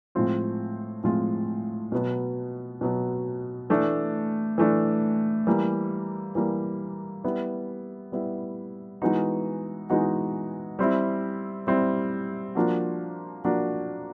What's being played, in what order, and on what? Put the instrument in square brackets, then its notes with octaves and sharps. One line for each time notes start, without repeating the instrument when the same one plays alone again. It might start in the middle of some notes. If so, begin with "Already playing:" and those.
[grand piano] A2 F3 G#3 C4 F4
A2 F3 G#3 C4 F4
B2 F#3 B3
B2 F#3 B3
E3 A3 D4
E3 A3 D4
E3 G3 A#3
E3 G3 A#3
G3 B3 E4
G3 B3 E4
E3 G#3 B3 D#4 F#4
E3 G#3 B3 D#4 F#4
G3 C4 E4
G3 C4 E4
F3 A#3 D4 F#4
F3 A#3 D4 F#4